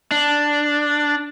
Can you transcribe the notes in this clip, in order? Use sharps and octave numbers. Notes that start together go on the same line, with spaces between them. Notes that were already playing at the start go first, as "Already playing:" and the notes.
D4